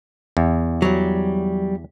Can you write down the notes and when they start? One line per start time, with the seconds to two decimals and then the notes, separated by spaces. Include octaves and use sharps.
0.37 E2
0.82 F#3 G3